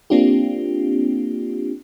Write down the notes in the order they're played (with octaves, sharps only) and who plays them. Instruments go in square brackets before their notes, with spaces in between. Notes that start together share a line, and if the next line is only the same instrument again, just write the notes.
[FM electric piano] A#3 C4 D4 F4 G4